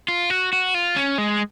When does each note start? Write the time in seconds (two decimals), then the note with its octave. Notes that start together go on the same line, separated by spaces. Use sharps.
0.08 F4
0.30 F#4
0.53 F#4
0.74 F4
0.96 C#4
1.18 G#3